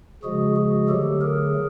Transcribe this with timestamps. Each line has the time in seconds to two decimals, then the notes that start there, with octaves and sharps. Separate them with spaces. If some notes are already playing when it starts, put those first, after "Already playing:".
0.23 C#3 F3 G#3 F#4 G#4
0.56 F#4 G#4
0.89 D3 F#3 A3 G4 A4
1.21 G#4 A#4